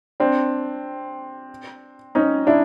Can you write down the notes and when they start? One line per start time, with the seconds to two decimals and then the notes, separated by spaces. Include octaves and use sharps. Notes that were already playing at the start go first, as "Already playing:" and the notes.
0.20 C4 D4
2.15 C#4 D#4
2.47 D4 E4